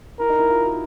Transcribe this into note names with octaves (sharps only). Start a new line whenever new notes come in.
E4 A#4
D#4
E4
F4
F#4